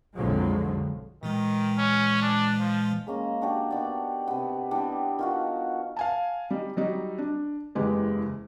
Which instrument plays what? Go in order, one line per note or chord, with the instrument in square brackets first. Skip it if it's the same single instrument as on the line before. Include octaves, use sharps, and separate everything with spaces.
[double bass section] B1 F2 D3 F3 F#3 G#3
[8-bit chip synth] A#2 E3 G#3 [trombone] D#3
[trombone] C#4
D4
F3
[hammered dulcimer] G#3 A#3 C#4 A#5
D4 F#4 G4 D5
D#3 B3 D5
C3 B3
E3 G3 B3 D4
D#3 F4 F#4
[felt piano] F5 G#5 A5
G3 D#4
F#3 G3 D#4
D4
F#1 E2 G#3 G4